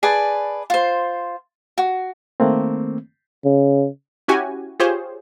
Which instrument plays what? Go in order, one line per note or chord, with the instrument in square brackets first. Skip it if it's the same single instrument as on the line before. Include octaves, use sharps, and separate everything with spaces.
[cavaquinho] G#4 B4 D5 A5
F4 C5
F#4
[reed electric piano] D#3 A3 A#3 C4
[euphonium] C#3
[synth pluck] C#4 E4 F#4 G4 G#5
F4 G4 G#4 C5 C#5